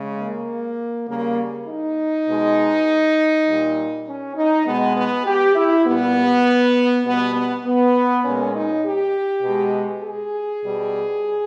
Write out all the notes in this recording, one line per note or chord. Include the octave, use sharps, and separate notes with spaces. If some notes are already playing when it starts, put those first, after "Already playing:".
Already playing: C#3 G#3
A#3
C#3 G3 A#3
D#4
B2 G#3
A#2 G3
C#4
D#4
B2 G#3 B3
B3
G4
E4
A#2 G3 B3
B2 G3 B3
B3
B3
A#2 G#3 C#4
D#4
G4
B2 G#3
G#4
B2 G3